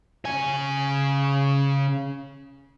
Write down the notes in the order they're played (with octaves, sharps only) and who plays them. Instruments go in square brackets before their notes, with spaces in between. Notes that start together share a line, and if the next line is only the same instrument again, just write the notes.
[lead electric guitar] C#3 G#5